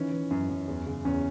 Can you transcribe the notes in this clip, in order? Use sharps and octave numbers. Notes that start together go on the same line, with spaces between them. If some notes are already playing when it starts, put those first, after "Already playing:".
Already playing: D#3 E3 C#4
E3
F#2
F#2
E2
C#3
E2 C#4